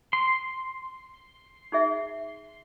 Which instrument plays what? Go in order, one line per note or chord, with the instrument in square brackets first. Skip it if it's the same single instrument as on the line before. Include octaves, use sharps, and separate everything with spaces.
[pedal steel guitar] C6
[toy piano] D#4 G#4 E5